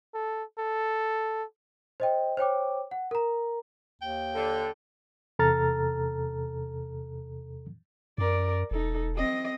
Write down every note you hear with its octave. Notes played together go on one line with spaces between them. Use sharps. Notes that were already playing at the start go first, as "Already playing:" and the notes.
A4
A4
C5 D#5 G5
C5 C#5 G5 D6
F#5
A#4 A#5
D#2 G5
D3 A4
E2 C3 A4 A#5 F6 A6
F#2 A#4 D5
E1 D#4 A4
C4 D#5